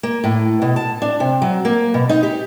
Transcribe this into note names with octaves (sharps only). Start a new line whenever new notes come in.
A#3
A2
B2
A5
D4
C3
F#3
A#3
B2
D#4
G4